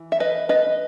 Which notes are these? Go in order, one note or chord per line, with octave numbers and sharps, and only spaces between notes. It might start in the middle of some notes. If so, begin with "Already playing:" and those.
Already playing: E3
E5
B4 D#5
B4 D#5